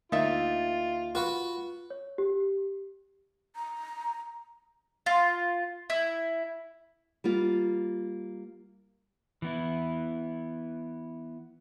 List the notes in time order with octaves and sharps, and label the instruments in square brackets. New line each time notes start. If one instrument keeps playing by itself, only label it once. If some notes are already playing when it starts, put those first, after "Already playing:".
[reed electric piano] D2 A#3 A6 [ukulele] D#4 E5 [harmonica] F4
[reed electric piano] F4 [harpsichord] F#4 B4 C#6
[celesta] C#5
G4
[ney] A#5
[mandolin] F4
E4
[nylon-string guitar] G3 A#3 F4
[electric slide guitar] E3 B3 E4